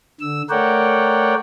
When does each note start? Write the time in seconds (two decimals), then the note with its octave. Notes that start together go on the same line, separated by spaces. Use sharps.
0.21 D3 E6
0.50 A3 A#4 C#5 D5 F#5 G5